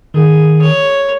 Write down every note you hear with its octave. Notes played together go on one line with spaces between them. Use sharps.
D#3 G#4
C#5